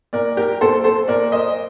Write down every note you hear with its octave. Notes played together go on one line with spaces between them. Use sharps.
A#2 A#4 D5
G4 A#4
A#2 A4 C5
A4 C5
A#2 A#4 D5
C5 D#5